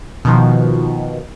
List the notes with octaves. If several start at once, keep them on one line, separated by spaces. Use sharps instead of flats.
B2 D#3 F3